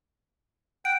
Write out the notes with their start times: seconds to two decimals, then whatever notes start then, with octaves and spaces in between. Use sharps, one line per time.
0.85 F#5 G5 D7